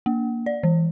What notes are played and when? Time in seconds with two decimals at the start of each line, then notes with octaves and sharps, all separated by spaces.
0.06 A#3
0.46 D5
0.63 E3